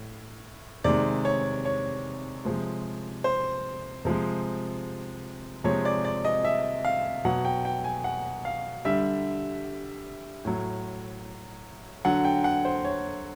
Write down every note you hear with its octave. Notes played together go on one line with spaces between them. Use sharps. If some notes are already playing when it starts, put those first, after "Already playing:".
Already playing: A2
C3 D#3 G#3 D5
C#5
C#5
C3 F3 G#3
C5
C3 F3 G#3
C3 F3 G#3 C#5
D5
D5
D#5
E5
F5
B2 F#3 F#5
G5
G5
G#5
F#5
F5
D3 G3 E5
A2 F#3
D3 F#3 F#5
G5
F#5
C5
C#5